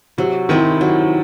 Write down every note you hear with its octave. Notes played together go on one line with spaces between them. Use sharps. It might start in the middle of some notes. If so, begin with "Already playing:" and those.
C3 F#3
D#3 C4 E4 G#4
F#3